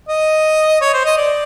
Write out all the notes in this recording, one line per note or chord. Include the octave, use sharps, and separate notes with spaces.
D#5
C#5
C5
D#5
D5